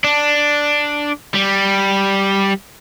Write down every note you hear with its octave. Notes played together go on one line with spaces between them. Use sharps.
D4
G3